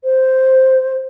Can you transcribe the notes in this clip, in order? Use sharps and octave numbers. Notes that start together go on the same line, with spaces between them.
C5